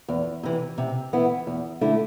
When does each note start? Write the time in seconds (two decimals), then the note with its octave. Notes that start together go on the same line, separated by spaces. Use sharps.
0.09 E2
0.43 C3 E3
0.78 C3
1.13 E3 B3 E4
1.47 E2
1.81 D3 A3 E4